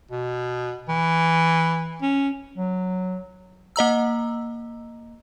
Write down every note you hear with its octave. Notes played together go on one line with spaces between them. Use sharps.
B2
E3
C#4
F#3
A#3 D#5 A#5 E6